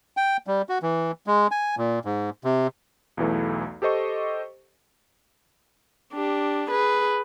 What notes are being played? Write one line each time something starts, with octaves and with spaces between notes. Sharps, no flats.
G5
G3
F#4
E3
G#3
G#5
A#2
G#2
C3
B1 E2 E3 A3
G4 A4 C5 D#5 C#6
D4 G4
G#4 B4